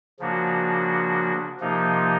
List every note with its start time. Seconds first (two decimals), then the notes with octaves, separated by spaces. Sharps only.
0.19 C#3 F3 A#3 D4 F#4
1.60 C3 F3 A#3 D#4